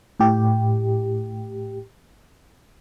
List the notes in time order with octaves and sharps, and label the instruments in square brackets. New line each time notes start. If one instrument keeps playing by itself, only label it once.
[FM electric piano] A2 G4